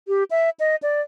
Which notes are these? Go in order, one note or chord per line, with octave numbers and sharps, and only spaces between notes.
G4
E5
D#5
D5